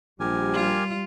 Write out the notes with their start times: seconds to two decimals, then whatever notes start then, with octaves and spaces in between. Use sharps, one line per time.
0.20 A#1 G3 G4 A#4 G#5
0.53 F4